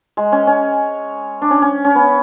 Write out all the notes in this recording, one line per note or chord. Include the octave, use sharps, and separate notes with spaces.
G#3
C#4
C#4
D4
C#4
C#4
C#4
B3